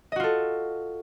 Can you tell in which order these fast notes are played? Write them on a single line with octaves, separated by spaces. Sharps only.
D#5 F#4 F4 A4